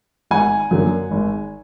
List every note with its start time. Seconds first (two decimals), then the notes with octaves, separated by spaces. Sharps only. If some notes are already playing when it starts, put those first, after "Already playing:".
0.31 G#1 F#5 G#5
0.71 F#2 D3 F#3 A#3
1.11 G#1